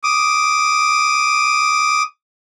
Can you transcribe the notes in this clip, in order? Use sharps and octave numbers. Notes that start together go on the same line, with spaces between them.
D6 D#6